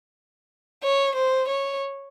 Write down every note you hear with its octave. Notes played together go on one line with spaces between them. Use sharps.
C#5
C5
C#5